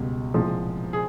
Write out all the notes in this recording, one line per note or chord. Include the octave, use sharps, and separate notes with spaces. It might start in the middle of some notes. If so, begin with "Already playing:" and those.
Already playing: C#2 B2 G3
C2 A#2 F3 G#3
G#4